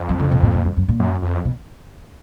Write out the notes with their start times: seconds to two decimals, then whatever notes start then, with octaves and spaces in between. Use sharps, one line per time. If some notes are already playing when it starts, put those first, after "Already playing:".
Already playing: F2
0.09 F3
0.20 D3
0.31 B2
0.43 A#2
0.54 A#2
0.66 F#2
0.77 F#2
0.88 A#2
1.00 F#2
1.22 F2
1.45 B2